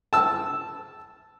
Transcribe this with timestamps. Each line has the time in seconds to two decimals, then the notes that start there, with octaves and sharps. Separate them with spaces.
0.13 A5 E6